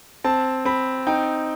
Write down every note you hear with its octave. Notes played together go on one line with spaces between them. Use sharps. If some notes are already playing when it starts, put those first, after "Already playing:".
C4 A5
C4 B5
D#4 G5